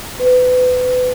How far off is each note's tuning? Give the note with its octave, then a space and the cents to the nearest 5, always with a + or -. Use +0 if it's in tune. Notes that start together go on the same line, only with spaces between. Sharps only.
B4 +30